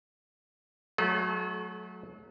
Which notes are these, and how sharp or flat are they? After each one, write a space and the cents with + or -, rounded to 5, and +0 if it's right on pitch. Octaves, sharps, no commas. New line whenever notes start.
F#3 -10 A3 -30 A4 -45